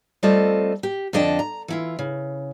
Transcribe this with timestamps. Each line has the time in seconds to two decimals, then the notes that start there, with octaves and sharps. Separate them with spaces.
0.23 G3 A3 C4 F4 A4 D#5
0.83 G4
1.13 F2 D3 D4 D#5 G5 A5
1.39 A#5
1.68 E3 E4 F4
1.99 C#3